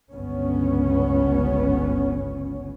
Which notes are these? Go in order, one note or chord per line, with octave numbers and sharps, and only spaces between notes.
G1 C#2 B3 C#4